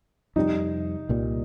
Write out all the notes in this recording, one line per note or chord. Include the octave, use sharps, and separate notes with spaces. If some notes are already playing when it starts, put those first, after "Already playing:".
F2 C3 G3 D#4
C2 A#2 G3